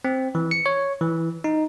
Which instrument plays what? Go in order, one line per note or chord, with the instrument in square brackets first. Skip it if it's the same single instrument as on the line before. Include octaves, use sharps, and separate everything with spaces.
[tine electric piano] C4
E3
C#7
C#5
E3
D#4